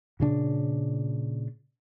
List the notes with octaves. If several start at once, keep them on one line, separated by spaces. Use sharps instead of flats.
A#2 C#3 D4